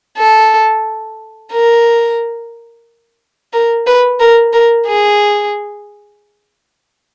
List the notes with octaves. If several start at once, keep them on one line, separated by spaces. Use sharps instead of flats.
A4
A#4
A#4
B4
A#4
A#4
G#4